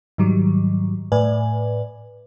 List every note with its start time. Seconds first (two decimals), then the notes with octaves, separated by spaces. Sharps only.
0.18 G#2 D#3 F#3 G3
1.12 A2 B4 D5 G#5